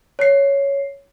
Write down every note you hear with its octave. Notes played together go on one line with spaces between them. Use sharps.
C#5 C7